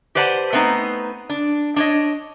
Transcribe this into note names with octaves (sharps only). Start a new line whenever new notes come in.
G4 B4 C5 D5 F#5 A5
A3 B3 C4 D#4
D4
D4 C#5 D#5